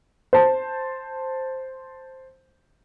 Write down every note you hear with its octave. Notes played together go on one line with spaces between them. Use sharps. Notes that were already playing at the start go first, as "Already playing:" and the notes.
C5 A5